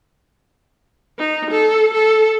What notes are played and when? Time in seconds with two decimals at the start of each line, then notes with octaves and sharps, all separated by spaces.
1.19 D#4
1.51 A4
1.94 A4